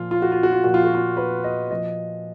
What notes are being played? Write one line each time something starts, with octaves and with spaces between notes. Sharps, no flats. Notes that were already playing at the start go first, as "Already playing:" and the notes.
Already playing: A#2 F3 F4
F4
F#4
F4
F#4
F4
A#2 F3 F#4
F4
F#4
F4
B4
D#5
A#2 F3 D#5